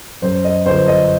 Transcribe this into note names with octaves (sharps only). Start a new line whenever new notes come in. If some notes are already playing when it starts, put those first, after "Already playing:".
F#2 C5
D#5
G1 C5
D#5